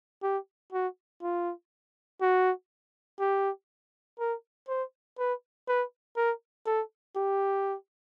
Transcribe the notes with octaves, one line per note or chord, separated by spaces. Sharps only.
G4
F#4
F4
F#4
G4
A#4
C5
B4
B4
A#4
A4
G4